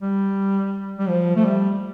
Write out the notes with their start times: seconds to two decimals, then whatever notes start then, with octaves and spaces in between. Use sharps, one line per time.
0.01 G3
0.99 G3
1.09 F3
1.36 A3
1.45 G3